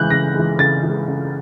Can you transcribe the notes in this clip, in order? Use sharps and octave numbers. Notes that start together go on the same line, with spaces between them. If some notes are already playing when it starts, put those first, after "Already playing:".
Already playing: C#3 E3 G#3 F#6 G6
C#3 A#6
E3 G#3
C#3 A6
E3 G#3
C#3